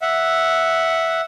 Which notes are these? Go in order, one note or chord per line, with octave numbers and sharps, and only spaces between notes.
E5 F#5